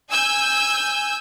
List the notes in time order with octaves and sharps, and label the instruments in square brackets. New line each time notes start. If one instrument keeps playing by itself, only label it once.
[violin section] G#5 E6 G6